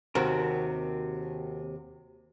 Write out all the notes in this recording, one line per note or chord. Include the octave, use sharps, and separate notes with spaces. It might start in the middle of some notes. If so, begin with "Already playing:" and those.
D#2 C3 C4 F#4 A#4